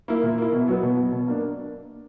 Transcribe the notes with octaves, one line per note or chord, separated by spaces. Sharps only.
A#3 E4
A#2
A#3 E4
B2
F#3 B3
B2
F#3 B3
B2
A#3 D4